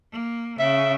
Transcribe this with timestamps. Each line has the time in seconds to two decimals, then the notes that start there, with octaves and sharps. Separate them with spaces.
0.11 A#3
0.59 C#3 E5